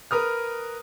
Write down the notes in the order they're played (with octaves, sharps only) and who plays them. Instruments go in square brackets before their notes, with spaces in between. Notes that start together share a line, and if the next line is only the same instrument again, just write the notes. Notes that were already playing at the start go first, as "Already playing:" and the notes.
[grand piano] A#4 B4 D#6 F6